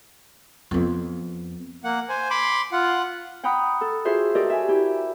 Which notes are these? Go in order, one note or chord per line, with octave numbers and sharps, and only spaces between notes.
F2 B3
A#3 F#5
C5 G#5
B5 C6 D6
F4 F#5
F#5 G5 A#5 B5 D#6 F#6
A4
F4 F#4 G#4 C5 E5
F#4 G4 A4 A#4 D5 D#5
E5 G#5
E4 G4